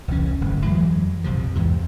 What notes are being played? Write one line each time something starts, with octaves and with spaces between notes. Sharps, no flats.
E1 C2 E3 C#4
D1 G1 A2
F2 E3 F#3 G#3
A#1 F2 C3 F3
E2 G#2 C3 E3